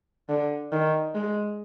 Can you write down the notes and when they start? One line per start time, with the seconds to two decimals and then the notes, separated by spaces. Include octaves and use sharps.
0.29 D3
0.72 D#3
1.15 G#3